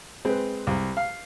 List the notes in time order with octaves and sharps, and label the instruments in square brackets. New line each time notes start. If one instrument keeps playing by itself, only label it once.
[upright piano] G#3 B4 [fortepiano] C4
[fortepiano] C2
F5